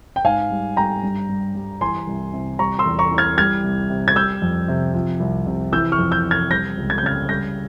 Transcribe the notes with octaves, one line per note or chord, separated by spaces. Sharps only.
G5
G#2 F5 G#5
G3
G3 G5 A#5
G2
G3
G3
E3 G#5 C6
C2
C3
G3 A#5 C#6
C6 E6
E2
A#5 C#6
E3
F6 G#6
G3 F6 G#6
C2
C3
G#6
G3 E6 G6
F2
C3
F3
C2
C3
E3 E6 G6
C#6 F6
F2
E6 G6
C3
F6 G#6
G3 G6 A#6
C#2
G#6
G6
C#3 F6 G#6
G3 G6 A#6